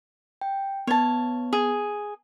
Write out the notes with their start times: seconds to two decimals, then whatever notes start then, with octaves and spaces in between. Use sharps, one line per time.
0.41 G5
0.87 B3 C#5 A5
1.53 G#4